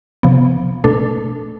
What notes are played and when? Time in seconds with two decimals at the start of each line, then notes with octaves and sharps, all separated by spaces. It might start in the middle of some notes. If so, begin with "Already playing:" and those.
0.23 C3 F3 B3
0.84 B2 A3 D4 A4